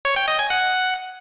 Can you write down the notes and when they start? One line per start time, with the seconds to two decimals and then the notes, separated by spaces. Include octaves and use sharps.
0.05 C#5
0.16 G5
0.28 D#5
0.39 G#5
0.50 F#5